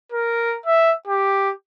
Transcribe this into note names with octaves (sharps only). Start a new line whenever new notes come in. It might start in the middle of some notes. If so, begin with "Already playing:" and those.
A#4
E5
G4